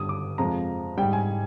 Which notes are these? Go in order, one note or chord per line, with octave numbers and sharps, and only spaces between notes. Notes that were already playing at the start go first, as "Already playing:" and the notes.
Already playing: G2 D3 G3 D#6
D6
F2 C3 F3 G#3 A#5
G#2 G3 G5
G#5